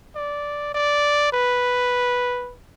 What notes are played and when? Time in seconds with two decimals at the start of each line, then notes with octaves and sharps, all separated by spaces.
0.15 D5
0.74 D5
1.33 B4